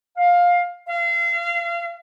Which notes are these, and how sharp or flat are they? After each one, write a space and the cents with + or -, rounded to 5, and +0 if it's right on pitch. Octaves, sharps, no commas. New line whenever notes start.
F5 +15
F5 -35